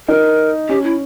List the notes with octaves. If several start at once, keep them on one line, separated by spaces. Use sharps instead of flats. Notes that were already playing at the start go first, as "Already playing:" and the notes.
D#4 A#4
C#4 G4
E4